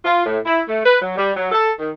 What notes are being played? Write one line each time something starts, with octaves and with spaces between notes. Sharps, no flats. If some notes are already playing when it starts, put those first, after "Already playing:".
F4
A2
E4
A3
B4
F#3
G3
F#3
A4
D#3